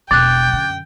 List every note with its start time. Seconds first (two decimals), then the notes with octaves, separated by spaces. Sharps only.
0.11 E1 C4 G5 D6 F#6 A6
0.53 F#2 D3